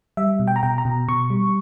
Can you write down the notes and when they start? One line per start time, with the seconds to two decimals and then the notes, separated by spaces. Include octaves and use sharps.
0.17 G3 E5
0.40 B2
0.48 G5
0.56 A#5
0.63 B2 G5
0.78 A#5
0.85 B2
1.08 B2 C#6
1.30 G3